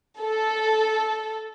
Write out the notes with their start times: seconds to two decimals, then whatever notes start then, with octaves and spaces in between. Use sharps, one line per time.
0.20 A4